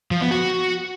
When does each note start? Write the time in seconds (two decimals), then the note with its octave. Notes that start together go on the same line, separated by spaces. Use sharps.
0.11 F3
0.21 B3
0.31 F#4